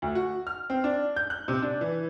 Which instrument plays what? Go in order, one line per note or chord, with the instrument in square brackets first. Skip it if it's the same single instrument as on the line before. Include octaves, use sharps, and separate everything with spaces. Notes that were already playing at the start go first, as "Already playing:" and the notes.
[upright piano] D2
F#4
F6
C4
D4
G6
F#6
C3
D4
E3